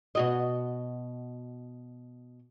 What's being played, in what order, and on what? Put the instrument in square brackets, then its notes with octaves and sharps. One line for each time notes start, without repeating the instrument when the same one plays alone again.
[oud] B2 F#4 D#5